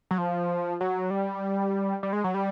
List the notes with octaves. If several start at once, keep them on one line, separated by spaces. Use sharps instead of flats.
F#3
F3
F#3
G3
G3
G#3
F#3
G3